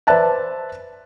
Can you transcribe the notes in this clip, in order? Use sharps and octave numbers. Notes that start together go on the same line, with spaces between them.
B4 C5 D5 E5 A5 F#6